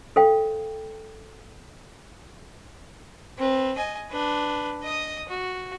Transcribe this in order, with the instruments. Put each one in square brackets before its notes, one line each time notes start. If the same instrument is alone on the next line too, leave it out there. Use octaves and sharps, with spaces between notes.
[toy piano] A4 C5 F5 G5
[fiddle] C4 B4
D#5 G#5
D4 B4
D#5 D#6
F#4